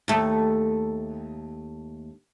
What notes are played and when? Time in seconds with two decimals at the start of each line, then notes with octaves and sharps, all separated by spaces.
0.08 D#2 A3